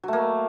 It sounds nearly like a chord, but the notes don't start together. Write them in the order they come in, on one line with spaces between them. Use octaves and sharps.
F#3 A3 A#3